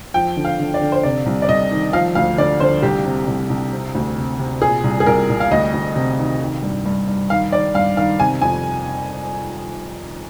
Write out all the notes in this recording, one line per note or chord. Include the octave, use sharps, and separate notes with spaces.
F3 G5
D3
F5
D3
D5
D3
C5
C3 D5
C2
D5
C2 D#5
D#3
F3 F5
D2 F5
D3 D5
D3 C5
C2 G4
C3
C2
C2
C3
D2
C3
C3
A#2 G#4
C2
G#4
C2 A#4
C2
F5
D2 D#5
D2
C3
D#3
D#3
G2
G2
G2
D#3 F5
D#3 D5
G2 F5
D#3 F5
C3 G#5
F2 G#5